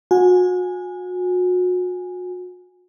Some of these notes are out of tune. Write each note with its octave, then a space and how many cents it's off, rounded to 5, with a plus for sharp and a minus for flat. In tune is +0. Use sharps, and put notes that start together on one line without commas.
F#4 -35 G#5 -5